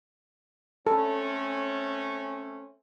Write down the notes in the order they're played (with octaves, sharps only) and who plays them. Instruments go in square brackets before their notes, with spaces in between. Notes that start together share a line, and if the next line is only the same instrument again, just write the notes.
[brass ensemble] A3 C4 C#4 [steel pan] A4